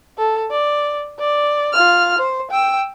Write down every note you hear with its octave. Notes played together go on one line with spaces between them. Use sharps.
A4
D5
D5
F4 F6
C5
G5 E6